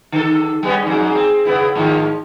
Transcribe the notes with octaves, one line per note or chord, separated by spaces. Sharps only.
D3 A4
G3 B3 C#4
F2 G#2
C4
C#3 B3 E4
G#2 D#3 F3